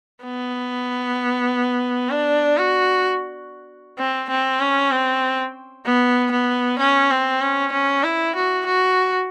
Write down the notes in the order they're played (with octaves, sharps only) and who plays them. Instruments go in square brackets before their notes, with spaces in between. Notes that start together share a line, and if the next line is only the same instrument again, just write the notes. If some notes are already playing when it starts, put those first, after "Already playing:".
[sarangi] B3
D4
F#4
C4
C4
C#4
C4
B3
B3
C#4
C4
C#4
C#4
E4
F#4
F#4